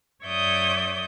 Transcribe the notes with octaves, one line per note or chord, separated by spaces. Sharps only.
F#2 C#5 D5 E5 D#6 G6